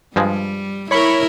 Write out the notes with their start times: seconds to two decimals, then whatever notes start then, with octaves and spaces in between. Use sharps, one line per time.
0.16 G2 F3 G3 G#3
0.91 E4 A#4 C#5 B5 C#6